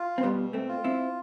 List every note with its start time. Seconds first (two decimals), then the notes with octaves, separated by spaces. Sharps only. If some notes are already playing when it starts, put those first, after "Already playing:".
Already playing: F4
0.18 C4
0.23 B2 G3 B3
0.53 A3 C4
0.69 F4
0.84 C4 E4